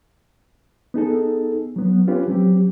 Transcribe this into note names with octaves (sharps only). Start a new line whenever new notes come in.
B3 D#4 G#4 A4
F#3 B3
C#4 F4 G4 B4
F#3 C4 G4